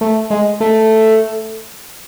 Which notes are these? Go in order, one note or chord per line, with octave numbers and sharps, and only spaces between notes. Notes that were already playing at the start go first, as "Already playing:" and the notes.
A3
G#3
A3